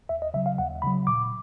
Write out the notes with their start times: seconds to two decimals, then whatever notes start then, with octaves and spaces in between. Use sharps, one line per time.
0.09 D#2 E5
0.22 D#5
0.34 C#3 F#3 E5
0.46 F5
0.58 D#2 F#5
0.82 C#3 F#3 B5
1.07 A#2 D6